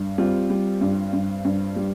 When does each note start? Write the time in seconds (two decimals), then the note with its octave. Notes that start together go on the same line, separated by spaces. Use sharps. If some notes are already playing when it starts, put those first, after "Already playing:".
Already playing: G2
0.18 G3 C4 F4
0.50 G3
0.81 G2
1.13 G2
1.45 G2
1.76 G3